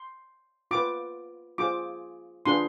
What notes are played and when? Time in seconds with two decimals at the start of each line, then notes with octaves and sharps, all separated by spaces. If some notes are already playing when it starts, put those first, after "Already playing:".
Already playing: C6
0.71 F4 B4 D6
1.58 F4 G#4 C5 D6
2.46 D4 F4 G#4 B4 C6